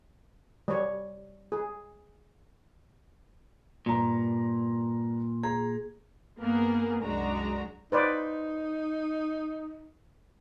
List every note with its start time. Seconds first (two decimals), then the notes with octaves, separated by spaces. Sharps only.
0.68 G3 C#5
1.52 G#4
3.86 G2 A#2 A#5
5.43 G#4 A#5
6.40 G2 A#3 B3 G#4 A#4
7.01 C2 F#2 G#3 D4 F#4 A#5
7.92 D#4 B4 C5 D5